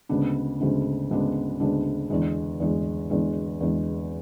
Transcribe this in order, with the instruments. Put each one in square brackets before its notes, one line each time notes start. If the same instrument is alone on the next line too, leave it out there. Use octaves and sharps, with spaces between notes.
[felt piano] D2 C#3 G#3 B3 D4
D2 C#3 G#3 B3 D4
D2 C#3 G#3 B3 D4
D2 C#3 G#3 B3 D4
E2 D3 G#3
E2 D3 G#3
E2 D3 G#3
E2 D3 G#3